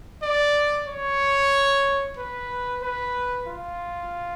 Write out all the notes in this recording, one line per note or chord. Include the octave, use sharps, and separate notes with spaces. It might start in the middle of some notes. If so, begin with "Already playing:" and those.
D5
C#5
B4
B4
F4